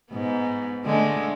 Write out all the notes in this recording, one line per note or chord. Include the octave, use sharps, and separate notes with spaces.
G#2 B3
D3 G#3 A3